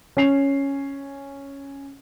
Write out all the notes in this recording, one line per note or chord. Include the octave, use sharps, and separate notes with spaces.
C#4 G#5 C7 F7